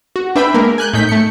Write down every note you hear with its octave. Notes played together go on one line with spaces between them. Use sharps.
F#4
D4 B4 E5 G5 B5
G#3 A#3 A#4
G#5 F#6 G6
A2 D#4 G6 B6
A3 C#7